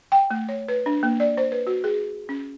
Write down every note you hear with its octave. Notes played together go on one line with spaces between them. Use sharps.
G5
A3
C#5
B4
D4
A#3
D5
C5
B4
F#4
G#4
C#4